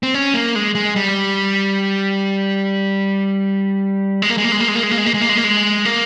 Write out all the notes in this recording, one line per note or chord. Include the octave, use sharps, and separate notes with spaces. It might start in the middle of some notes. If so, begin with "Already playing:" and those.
C4
C#4
A#3
G#3
G#3
G3
G#3
A#3
G#3
A#3
G#3
A#3
G#3
A#3
G#3
A#3
G#3
A#3
G#3
A#3
G#3
A#3
G#3
A#3